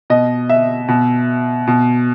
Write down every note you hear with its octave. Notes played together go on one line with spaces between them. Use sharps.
B2 D#5
E5
B2
B2